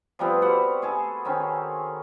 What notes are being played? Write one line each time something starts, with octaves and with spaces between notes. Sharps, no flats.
F3 G3 B3 C4
G3 F#4 F#5
G#4 A4 A5
D#3 C4 C#4